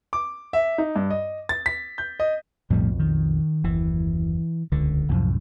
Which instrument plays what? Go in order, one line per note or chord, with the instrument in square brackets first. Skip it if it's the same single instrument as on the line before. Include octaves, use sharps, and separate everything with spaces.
[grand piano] D6
E5
D#4
G2
D#5
A6
B6
G6
D#5
[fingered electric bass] B1 F2 [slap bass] A2 F3 G3
[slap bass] D#3
[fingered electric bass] F#1 D#2 [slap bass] E3
[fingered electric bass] D#1 C#2 [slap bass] D3
[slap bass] C2 F#2 A2 [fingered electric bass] F3 F#3